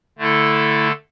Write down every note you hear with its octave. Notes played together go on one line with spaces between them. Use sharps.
D3 A3 E4 A4